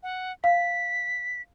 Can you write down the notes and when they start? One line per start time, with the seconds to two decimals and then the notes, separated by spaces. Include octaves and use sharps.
0.03 F#5
0.44 F5 B6